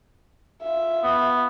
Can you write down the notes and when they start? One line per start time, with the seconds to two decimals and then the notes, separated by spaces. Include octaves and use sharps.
0.62 F4 E5
1.04 B3